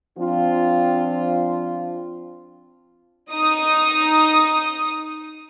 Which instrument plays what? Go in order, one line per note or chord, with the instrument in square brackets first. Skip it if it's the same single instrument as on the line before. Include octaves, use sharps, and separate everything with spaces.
[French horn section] F3 C4 D4 F4
[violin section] D#4 D#6